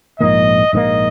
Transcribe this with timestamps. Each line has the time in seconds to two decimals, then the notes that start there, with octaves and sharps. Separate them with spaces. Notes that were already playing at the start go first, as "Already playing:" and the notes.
0.20 A#1 G#2 F3 A#3 D#5
0.73 A#1 G#2 F3 A#3 D#5